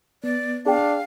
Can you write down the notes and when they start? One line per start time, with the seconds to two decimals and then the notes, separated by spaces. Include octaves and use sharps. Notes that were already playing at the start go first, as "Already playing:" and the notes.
0.24 B3 D5
0.66 D4 G#4 F5 G5